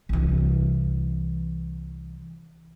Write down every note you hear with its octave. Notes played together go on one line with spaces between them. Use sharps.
C2 E3